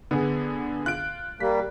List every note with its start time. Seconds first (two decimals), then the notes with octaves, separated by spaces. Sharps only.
0.11 D3 B3 G#4
0.86 F4 F#6 D7
1.40 G3 A#3 B6